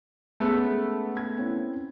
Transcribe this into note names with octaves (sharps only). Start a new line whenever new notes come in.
G#3 A3 B3 C#4 G#4
G#6
C4 C#4 E4